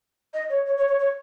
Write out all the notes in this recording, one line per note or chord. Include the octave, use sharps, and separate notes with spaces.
D#5
C#5
C#5
C#5
C#5
C#5